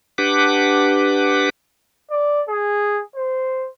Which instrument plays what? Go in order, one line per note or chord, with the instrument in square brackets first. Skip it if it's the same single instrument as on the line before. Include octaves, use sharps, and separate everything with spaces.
[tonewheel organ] D4 G4 B4 F#5 D6
[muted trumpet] D5
G#4
C5